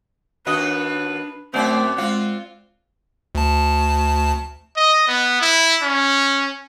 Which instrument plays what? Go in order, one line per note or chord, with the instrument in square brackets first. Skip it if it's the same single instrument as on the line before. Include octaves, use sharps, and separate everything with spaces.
[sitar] D#2 F#4 D#5 [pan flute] D4 [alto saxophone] B4
[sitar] F#2 D5 [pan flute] A3 [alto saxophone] C4
[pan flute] G#3 [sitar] C4 F4 [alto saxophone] F#5
[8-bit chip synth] D2 A5
[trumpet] D#5
B3
E4
C#4